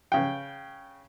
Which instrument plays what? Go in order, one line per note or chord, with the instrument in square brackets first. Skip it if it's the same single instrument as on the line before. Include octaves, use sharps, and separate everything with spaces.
[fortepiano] C#3 G5